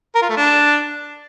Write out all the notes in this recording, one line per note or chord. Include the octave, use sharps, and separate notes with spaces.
A#4
F4
A3
D4